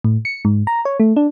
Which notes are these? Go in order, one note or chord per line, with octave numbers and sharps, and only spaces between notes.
A2
C#7
G#2
A#5
C#5
A3
D4